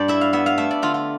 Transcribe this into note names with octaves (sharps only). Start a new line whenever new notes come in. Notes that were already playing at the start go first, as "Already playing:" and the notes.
Already playing: G2 D5
E4 E5
F5
B3 E5
F5
A3 E5
D5
D3 F4
F4